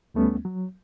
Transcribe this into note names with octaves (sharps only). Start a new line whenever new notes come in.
D2 G3 A3 B3 C#4
F#3